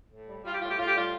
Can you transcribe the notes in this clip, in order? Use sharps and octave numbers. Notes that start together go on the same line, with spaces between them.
A2
G3
G3 F4
G4
A2 F4
G4
A2 F4
G4
G3 F4